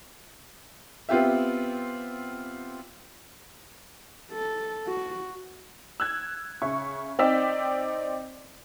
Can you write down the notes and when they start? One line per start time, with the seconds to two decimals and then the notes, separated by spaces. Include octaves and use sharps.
1.09 B3 C4 F4 G4 E5
4.31 A4
4.87 F#4
6.00 E6 F#6 G#6
6.62 C#3 E5 C#6
7.19 C4 D#4 D5 G5 E6 B6